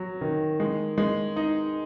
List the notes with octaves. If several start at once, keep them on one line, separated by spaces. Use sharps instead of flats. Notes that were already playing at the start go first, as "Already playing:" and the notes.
Already playing: F#3
D#3
G#3
G#3
D#4